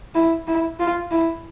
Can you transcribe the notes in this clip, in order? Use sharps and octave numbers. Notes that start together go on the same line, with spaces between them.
E4
E4
F4
E4